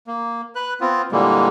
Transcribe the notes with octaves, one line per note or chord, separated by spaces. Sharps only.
A#3
B4 F#6
B3 C4 F4
A#2 D3 E3 G3 G#3 A#3